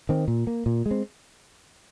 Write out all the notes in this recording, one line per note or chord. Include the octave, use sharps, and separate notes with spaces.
D#3 C4
A#2
A#3
A#2
G#3
C4